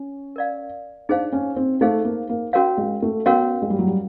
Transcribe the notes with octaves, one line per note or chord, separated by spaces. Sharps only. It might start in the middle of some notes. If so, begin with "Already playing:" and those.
Already playing: C#4
A#4 D5 F5
D4 D#4 G#4 C5 F5
C#4
C4
A3 D#4 G#4 C5 F5
A#3
A#3
C#4 F#4 A#4 C#5 F5
G#3
A3
B3 C#4 F#4 A#4 C#5 F5
G#3
G3
F#3
G3